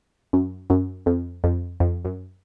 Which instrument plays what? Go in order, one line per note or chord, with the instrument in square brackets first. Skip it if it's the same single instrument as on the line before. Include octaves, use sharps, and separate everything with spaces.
[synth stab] F#2
F#2
F2
F2
F2
F#2